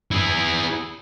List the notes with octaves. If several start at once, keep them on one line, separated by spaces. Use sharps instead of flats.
E4 G#4